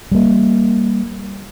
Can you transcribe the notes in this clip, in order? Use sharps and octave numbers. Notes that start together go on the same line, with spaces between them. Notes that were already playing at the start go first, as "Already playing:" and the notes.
G3 A#3